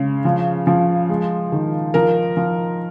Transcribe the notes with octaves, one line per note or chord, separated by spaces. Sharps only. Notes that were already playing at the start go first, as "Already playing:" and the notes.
Already playing: C#3 G#3
F3
F3
G#3
D#3
F3 A#4
F3